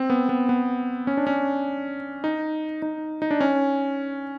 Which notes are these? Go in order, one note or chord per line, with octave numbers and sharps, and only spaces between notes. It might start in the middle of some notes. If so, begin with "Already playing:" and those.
Already playing: C4
B3
B3
B3
C#4
D4
C#4
D#4
D#4
D#4
D4
C#4